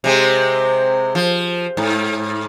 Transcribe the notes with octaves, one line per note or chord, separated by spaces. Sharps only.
C3 G#3 C4
F3
G#2